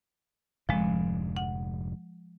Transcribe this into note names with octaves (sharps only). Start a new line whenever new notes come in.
F1 G#2 D3 F3 G#3
F#5